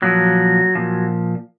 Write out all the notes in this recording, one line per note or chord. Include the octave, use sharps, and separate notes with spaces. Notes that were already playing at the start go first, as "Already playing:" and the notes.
A#2 F3 F#3
A#2 F3